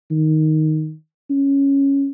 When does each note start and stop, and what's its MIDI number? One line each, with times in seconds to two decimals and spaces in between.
0.11 0.94 51
1.30 2.10 61